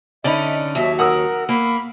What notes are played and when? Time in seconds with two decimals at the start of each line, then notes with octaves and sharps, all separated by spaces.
0.24 D3 C#4 D#4 D5 E5 B5
0.75 D#2 F#3 E5
0.99 A#4 F#5 D#6 E6
1.49 A#3 B5